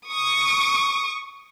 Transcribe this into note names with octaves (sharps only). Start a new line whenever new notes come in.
C#6 D#6